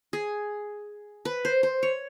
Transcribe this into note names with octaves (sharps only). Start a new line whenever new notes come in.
G#4
B4
C5
C5
C#5